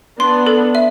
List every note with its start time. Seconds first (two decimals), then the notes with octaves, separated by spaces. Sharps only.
0.20 B3 D4 C6
0.46 A4
0.75 E5